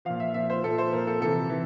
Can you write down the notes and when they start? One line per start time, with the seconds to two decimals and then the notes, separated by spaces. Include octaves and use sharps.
0.05 A#2 F3 F5
0.20 E5
0.34 A#2 F3 E5
0.50 C5
0.64 A#2 F3 A4
0.78 C5
0.92 A#2 F3 A#4
1.07 A4
1.21 C3 E3 A4
1.50 E3